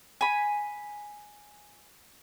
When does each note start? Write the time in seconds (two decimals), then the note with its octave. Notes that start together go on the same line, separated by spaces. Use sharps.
0.21 G#5 B5